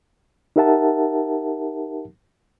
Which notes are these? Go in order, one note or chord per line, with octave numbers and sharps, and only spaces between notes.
D#4 G4 A#4 E5 F#5 A5